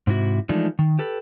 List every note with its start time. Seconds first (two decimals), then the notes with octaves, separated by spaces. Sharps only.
0.07 G#2 C3 E4 F#4
0.49 E3 F3 G#3 A3 D4 D#4
0.79 D#3
0.99 G4 A4 B4